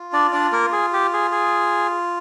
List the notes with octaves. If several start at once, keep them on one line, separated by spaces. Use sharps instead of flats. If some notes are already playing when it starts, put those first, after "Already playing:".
Already playing: F4
D4 D5
D4 D5
A#3 A#4
G#4
G4
G#4
G#4